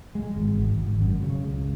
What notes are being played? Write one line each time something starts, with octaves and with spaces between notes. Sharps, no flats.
G#3
G#1
G#1
G#1
F#2
C#3
C#2